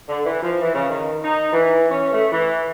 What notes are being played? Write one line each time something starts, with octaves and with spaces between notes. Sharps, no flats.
D3
E3
F3
E3
C#3
D#3
D#4
E3
C#4
A3
E3